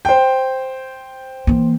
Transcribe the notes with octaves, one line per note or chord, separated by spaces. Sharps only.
C5 G5
E3 A#3